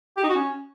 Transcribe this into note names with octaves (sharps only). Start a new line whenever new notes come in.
G4
D#4
F#4
C#4